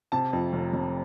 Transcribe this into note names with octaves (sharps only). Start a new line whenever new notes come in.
C3 A5
F2
F1
F1